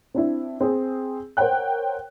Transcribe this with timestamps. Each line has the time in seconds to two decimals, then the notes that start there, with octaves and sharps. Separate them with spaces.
0.14 C4 D4 E4
0.60 C4 G#4
1.37 A#4 C5 C#5 F#5 G5 F#6